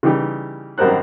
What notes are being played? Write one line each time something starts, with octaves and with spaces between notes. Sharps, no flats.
C#3 E3 G3 D#4 G4
G#1 F#2 G3 A#4 C5 F#6